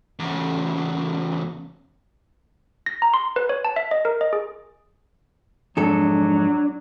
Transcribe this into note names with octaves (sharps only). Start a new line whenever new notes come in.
E2 C#3
A#6
A#5
C6
B4
C#5
A5
E5
D#5
A#4
D#5
G#4
F2 G#2 F#3 D4 A4